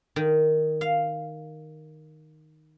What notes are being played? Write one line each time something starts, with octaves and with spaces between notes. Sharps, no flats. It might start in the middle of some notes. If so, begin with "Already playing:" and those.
D#3
F5